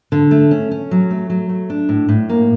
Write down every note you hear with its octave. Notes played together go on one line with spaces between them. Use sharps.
D3
A3
C#4
C#4
F#3
A3
F#3
A3
D4
A2
A2
A#3